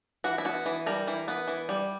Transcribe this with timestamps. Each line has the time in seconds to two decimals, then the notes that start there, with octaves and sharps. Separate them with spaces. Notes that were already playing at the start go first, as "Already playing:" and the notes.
0.24 E3 F#4
0.38 E4
0.45 B3 F#4
0.66 E3
0.86 G3 A#4
1.07 E3
1.28 B3
1.48 E3
1.69 G3